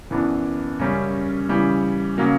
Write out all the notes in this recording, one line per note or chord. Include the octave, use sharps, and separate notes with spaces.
F#2 E3 B3 D4
F#2 C#3 G3 C#4
C#3 E3 G3
C#3 F#3 A#3